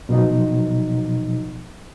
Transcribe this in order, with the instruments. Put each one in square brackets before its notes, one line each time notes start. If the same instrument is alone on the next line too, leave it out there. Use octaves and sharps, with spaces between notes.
[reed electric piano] B2 F3 F#3 D#4